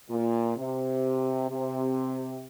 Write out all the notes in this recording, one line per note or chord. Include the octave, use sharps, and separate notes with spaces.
A#2
C3
C3